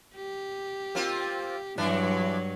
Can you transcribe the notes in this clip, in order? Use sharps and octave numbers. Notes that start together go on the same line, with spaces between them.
G4
A#3 C4 F4
G2 E3 F#3 D4